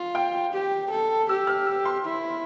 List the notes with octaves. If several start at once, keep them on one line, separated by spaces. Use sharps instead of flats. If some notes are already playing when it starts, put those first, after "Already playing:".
Already playing: F4
G5
G4
A4
G4 E6
F6
E6
C6
E4